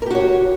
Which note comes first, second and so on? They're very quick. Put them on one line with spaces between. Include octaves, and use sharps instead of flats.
A#4 G4 F#4 C#5